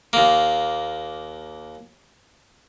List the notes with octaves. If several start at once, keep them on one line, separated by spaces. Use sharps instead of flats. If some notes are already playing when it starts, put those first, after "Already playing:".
D#2 A#3